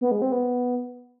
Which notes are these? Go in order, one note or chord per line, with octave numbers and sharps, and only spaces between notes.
B3
G#3
C4
B3